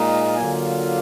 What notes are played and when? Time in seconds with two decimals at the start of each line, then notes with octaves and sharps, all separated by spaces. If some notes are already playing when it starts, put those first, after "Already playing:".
Already playing: A#2 G#3 D#4
0.37 D3 F#3 A#3 F4 G#5